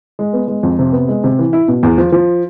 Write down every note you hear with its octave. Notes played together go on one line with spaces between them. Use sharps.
G#3
B3
G#3
F2
C3
B3
G#3
C3
E3
E4
B2
E2
F3
F3